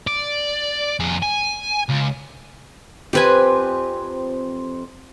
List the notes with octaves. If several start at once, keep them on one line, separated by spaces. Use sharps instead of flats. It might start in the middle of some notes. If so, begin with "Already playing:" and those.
D5
F2 G#4
G#5
C#2
F2 C4 G4 B4 C5 G#5